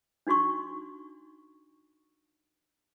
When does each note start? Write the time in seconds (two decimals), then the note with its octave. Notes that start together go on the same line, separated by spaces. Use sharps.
0.27 D4 D#4 F#4 C6 C#6